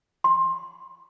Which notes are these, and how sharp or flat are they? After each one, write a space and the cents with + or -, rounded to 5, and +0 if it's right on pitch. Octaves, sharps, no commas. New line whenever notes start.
C6 +20